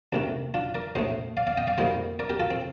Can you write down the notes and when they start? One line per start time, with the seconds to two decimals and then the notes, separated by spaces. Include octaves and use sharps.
0.13 D2 C3 D#3 A3 D4
0.54 D4 F4
0.75 A#4 D5
0.95 A#1 A2 A3 C5 D#5
1.37 D5 F5
1.47 D5 F5
1.57 D#5 G5
1.67 D5 F5
1.78 F2 D#3 G3 A#3 C5 D#5
2.19 A#4 D5
2.30 G4 A#4
2.40 F4 A4
2.50 C4